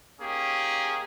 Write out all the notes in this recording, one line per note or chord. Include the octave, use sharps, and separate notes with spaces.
A#3 C#4 D#4 G4 G#4